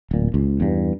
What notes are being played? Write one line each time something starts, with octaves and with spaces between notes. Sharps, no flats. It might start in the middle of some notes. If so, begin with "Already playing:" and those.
D1 A#2
C#2
E2 G2